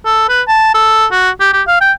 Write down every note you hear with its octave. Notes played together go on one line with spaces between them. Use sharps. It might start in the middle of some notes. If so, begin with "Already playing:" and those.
A4
B4
A5
A4
F#4
G4
G4
F5
G5